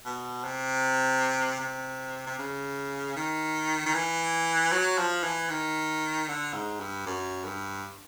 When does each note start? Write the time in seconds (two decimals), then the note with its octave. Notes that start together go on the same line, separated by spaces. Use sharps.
0.05 B2
0.44 C3
1.60 C3
2.27 C3
2.39 C#3
3.16 D#3
3.86 D#3
3.94 E3
4.73 F#3
4.98 F3
5.23 E3
5.50 D#3
6.29 D3
6.54 G#2
6.80 G2
7.06 F#2
7.44 G2